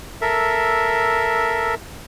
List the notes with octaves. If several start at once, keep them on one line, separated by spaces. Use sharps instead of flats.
A4 A#4 E5